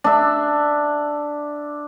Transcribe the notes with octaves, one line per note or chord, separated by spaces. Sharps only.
D4 E5